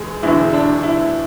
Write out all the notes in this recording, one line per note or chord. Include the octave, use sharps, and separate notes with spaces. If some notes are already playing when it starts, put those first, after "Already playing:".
Already playing: E1 E2 G#3 G#4
E1 E2 D3 G#3 E4
D4
E4